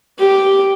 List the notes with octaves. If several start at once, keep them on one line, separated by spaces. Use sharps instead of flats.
G4